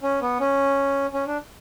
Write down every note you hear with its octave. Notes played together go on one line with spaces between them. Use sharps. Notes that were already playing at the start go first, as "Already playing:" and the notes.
C#4
B3
C#4
C#4
D4